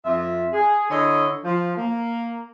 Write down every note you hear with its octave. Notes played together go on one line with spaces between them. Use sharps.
F2 F4 E5
G#4
D3 E4 C#5 D#5
F3
A#3